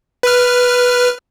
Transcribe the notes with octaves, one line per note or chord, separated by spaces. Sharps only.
B4 F6